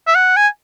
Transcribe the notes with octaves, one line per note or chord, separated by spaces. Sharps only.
E5
F#5
G#5